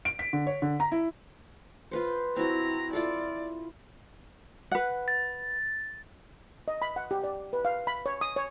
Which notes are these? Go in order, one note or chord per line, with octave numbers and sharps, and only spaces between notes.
D7
B6
D3
C#5
D3
A#5
E4
F4 B4 C5
C4 E4 F#4 A#5
E4 F4 A4 D5
B4 F#5
A6
D#5
B5
F#5
G4
D5
B4
F5
B5
C#5
D#6
C#5